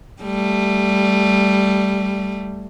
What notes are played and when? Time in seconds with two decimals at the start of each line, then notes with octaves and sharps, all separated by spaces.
0.22 G3 A3